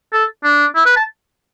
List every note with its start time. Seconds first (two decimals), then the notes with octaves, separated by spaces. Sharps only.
0.13 A4
0.44 D4
0.76 E4
0.86 B4
0.96 A5